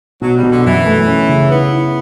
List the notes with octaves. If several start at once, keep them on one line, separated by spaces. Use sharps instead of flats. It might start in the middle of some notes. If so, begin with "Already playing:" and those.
B2 F#3
G3
B2
D3
F#2 E3
A3
C#4
C#3
B3 E4
E4